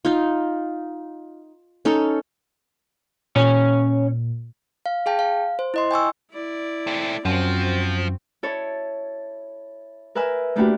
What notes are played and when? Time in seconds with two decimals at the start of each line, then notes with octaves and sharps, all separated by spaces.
0.05 D#4 F4
1.85 C#4 D#4 A4
3.36 A#2 C#4 C#5 G#5
4.86 F5
5.06 G#4 F5 G5 A5
5.19 F5
5.59 C5
5.74 E4 D#5 C6
5.91 G5 G#5 C#6 E6
6.31 E4 D5
6.87 A3 C4
7.25 F#2 F3 C4 F#4
8.43 E4 A4 C#5
10.15 A#4 B4 E5 G#5 E6
10.56 A3 A#3 D4 E4 F#4 G4